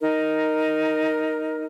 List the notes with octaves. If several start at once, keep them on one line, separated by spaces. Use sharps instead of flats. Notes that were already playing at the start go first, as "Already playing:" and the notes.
D#4 A#4